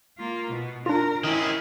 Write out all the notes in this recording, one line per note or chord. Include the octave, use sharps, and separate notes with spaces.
A#3 F4
B2 B3
D4 F4 A#4
D#3 C#4 E4 G#4 D7